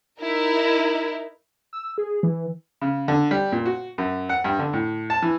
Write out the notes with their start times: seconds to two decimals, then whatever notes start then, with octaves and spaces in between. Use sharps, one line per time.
0.21 D#4 E4 A#4
1.73 E6
1.98 G#4
2.23 E3
2.81 C#3
3.08 D3
3.31 G3
3.52 A#2
3.66 F#4
3.98 F#2
4.29 F#5
4.44 G2
4.59 D3
4.73 A2
5.10 A5
5.22 E3